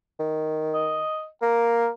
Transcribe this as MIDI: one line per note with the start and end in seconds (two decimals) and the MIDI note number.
0.19 1.02 51
0.74 1.26 75
1.42 1.89 58
1.42 1.88 70